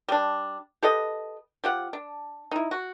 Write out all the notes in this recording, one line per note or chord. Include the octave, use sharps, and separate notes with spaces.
G3 D4
G4 A4 B4 D#5
F3 G4 F#5
D4
D#4 E4
F#4